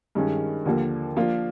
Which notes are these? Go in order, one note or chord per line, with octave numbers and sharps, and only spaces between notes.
G2 D#3 G#3 C#4
D#2 D3 F3 A#3
F3 A#3 D4 F4